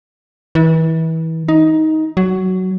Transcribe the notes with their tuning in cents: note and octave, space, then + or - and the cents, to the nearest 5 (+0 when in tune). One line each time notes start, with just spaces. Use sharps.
E3 -30
D#4 +15
F#3 +10